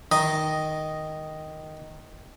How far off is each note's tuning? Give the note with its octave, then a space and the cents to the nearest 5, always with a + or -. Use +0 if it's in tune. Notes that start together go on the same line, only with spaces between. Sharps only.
D#3 +0 D#5 +0